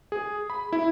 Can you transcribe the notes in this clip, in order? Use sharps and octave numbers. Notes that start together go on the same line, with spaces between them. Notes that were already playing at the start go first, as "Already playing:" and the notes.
G#4
B5
E4